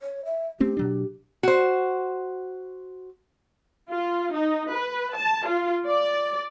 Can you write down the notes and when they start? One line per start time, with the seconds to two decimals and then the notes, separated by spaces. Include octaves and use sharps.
0.01 C#5
0.25 E5
0.60 A3 C4 C#4 G4
0.77 B2 F#3 D4
1.43 F#4 C5
3.89 F4
4.34 D#4
4.71 B4
5.16 A5
5.46 F4
5.86 D5